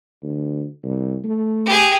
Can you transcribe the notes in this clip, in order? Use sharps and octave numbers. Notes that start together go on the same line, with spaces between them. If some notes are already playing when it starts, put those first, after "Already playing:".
D2
C2
A3
G4 G#4